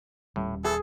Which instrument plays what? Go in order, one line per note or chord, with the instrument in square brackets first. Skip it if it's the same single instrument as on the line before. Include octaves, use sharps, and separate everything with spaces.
[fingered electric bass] D#1 G3 C#4 [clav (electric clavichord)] A2
[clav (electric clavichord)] E3 [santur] G#4 [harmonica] A4